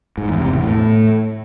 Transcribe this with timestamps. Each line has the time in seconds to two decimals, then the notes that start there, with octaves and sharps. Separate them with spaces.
0.18 G#2
0.29 E2
0.40 C3
0.51 E2
0.63 A2